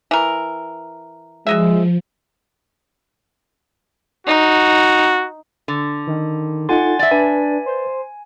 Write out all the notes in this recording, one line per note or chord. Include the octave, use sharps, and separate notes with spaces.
E3 A#4
F3 F#3 G#3 D#5 E5
D#4 F#4
D3
D#3
D#4 F4 A4 F#5 G#5 C6 A6
D5 E5
D4 B4 G#5
C5